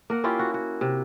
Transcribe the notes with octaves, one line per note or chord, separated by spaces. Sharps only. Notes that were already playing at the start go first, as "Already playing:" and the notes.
A#3 A#4 F#5
C#4 E4 F4 G4
F#4
F#4
C3